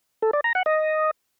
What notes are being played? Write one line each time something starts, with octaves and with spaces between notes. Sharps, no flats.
A4
D5
A#5
F#5
D#5